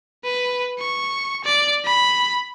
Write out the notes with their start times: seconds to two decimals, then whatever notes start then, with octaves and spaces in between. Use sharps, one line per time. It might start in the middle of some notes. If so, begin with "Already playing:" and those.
0.24 B4
0.79 C#6
1.44 D5
1.85 B5